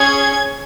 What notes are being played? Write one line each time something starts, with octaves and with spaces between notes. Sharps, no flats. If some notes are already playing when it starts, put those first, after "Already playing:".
Already playing: C#4 G#4 G#6